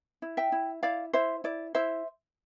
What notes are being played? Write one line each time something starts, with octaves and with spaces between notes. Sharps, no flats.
E4
E5 G5
E4
E4 D5 F5
E4 C5 E5
E4 D5
E4 C5 E5